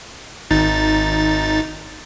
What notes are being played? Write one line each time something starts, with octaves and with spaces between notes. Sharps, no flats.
G#1 D#4 A6